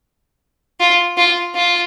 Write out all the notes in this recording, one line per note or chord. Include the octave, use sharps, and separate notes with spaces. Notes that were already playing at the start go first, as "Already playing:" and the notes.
F4
F4
F4